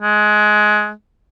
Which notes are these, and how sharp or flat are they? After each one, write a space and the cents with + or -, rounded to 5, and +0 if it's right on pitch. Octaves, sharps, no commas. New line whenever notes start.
G#3 +20